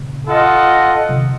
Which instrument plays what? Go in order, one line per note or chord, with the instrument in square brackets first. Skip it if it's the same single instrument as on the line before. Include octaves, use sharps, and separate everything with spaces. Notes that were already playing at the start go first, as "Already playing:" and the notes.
Already playing: [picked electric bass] A#2 C#3
[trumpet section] F4 A4 D#5 F#5
[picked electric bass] C3 D#3